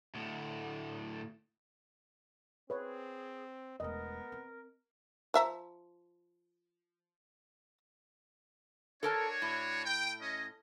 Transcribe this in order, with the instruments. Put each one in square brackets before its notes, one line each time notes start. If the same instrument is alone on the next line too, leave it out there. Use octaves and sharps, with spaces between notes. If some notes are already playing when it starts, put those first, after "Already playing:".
[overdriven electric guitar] D2 A2
[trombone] C4 [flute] G#4 [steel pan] B4 C#5
[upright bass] E1 A3 [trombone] B3 [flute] A#4 [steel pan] D#5
[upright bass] C4
[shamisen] F3 E5 A#5
[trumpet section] D4 F#4 C#5 [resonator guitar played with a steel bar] A4 A#4 A5
[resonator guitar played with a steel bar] A2
[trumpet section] G5
C#4 D#5